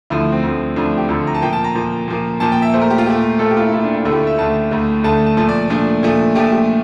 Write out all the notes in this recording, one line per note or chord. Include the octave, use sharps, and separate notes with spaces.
D2 D3 F3 E4
C4
D2 D3 F3
D2 D3 F3 D4
G4
D2 D3 F3 A4
A#5
A5
A#2 F3 A#3 G5
A5
A#5
A#2 F3 A#3
A#2 F3 A#3
A#2 F3 A#3 A5
G5
E5
A#2 A3 C5
A#4
G4
F4
A#2 A3 G4
A#2 A3 A4
G4
F4
E4
A#2 A3 E4
D4
E4
D2 D3 A3 E4
G4
F4
E5
D2 D3 A3 A5
D2 D3 A3
D2 D3 A3 A5
A5
A#2 F3 A3 A5
D5
A#2 F3 A3 D4
A#2 F3 A3
A#2 F3 A3 G4
G4